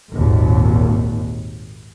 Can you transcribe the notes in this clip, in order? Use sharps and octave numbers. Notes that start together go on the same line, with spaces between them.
G#1 D#2 A#2